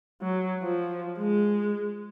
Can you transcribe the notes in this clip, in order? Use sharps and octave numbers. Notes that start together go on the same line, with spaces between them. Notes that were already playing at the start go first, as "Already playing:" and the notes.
F#3
F3
G#3